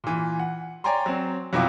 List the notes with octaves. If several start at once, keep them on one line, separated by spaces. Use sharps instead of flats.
A#2 E3
F#5
C#5 D5 G5 G#5 A#5 C6
F#3 C4
F2 B2 F#3 E4 F4 D6